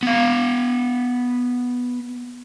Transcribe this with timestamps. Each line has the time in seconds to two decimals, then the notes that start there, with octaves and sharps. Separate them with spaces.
0.03 B3 F5